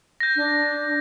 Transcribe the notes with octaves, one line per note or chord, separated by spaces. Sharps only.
G6 A#6
D4